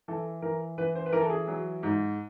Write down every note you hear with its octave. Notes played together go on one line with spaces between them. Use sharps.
E3 A4
E3 A#4
E3 B4
C5
B4
E3 A#4
A4
G#4
F#3
G#2